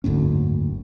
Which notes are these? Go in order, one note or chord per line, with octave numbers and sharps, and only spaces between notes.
F#1 D2 G#2 C#4